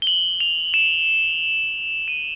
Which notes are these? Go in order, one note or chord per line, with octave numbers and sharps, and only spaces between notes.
G7
F#7
F7
E7
D#7